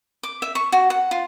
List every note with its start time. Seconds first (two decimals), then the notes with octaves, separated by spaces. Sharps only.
0.23 D6
0.42 E5
0.55 C#6
0.72 F#4
0.90 F#5
1.11 F4